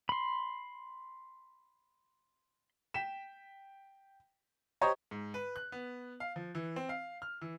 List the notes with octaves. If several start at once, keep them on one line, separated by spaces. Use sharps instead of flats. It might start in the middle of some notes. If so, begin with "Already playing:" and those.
B5 C6
G5 B6 E7
G4 C5 C#5 D#5 A#5
G#2
B4
F#6
B3
F5
F3
E3
C4
F5
F6
E3